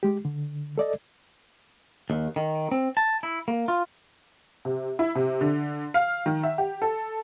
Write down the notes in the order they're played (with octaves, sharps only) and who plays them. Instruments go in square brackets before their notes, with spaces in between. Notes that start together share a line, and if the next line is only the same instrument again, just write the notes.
[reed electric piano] G#3 G4
D3
A4 D5 D#5
[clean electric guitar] D#2
D#3
C4
A5
E4
A#3
F4
[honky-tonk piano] C3
E4
C3
D3
F5
D#3
E5
G4
A4